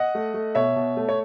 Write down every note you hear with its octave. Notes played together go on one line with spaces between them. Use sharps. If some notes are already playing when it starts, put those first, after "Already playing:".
Already playing: D#5 F#5
A3
A3
B2 C#5 E5
B2
A3
C#5